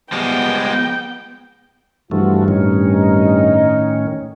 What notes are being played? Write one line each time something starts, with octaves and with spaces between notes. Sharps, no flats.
F3 G3 G#3 B3 G5
G2 E3 F3 A3 F4 F#4
A2 D#3 C#4 D#4